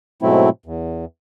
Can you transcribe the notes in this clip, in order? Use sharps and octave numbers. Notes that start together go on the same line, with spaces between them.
G#2 B2 F#3 A3 C4 E4
E2